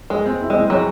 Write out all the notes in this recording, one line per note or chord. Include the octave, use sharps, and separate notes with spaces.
G#3 G#4
C4
E4
G#3 C4
F#3 G#4